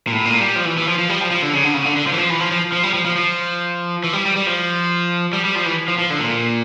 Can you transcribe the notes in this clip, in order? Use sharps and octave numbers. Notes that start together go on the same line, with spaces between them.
A#2
A2
A#2
G3
F3
E3
E3
F3
F3
G3
F3
F3
D3
C#3
D3
C#3
D3
D3
F3
E3
F3
E3
F3
F3
F3
G3
F3
F3
F3
E3
G3
G3
G3
F3
G3
G3
F3
E3
F3
F3
D3
A#2